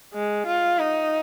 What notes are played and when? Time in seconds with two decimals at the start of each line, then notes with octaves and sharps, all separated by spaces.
0.14 G#3
0.47 F4
0.79 D#4